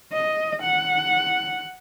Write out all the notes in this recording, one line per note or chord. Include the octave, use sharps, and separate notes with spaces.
D#5
F#5